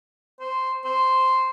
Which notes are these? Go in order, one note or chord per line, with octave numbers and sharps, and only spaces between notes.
C5
C5